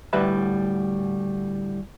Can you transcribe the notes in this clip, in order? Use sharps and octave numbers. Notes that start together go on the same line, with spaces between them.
D2 A2 G3 B4 E5 B5